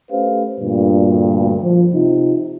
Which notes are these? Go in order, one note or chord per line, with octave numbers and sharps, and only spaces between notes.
A3 C#4 G4 B4 C5 F5
D2 G2 A#2
F3
C3 D#4 F4